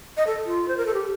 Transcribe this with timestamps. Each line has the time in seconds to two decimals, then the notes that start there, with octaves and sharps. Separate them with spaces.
0.17 D#5
0.27 A4
0.46 F4
0.68 C5
0.77 A#4
0.86 A4
0.94 G4